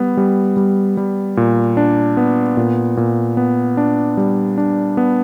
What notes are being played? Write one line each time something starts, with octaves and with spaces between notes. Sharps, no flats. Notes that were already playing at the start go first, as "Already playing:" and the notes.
Already playing: G3 B3
G3
G3
G3
A#2
D4
B3
A#2
A#2
B3
D4
G3
D4
B3